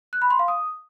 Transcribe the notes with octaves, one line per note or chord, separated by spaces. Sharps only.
F#6
B5
C6
F5
D#6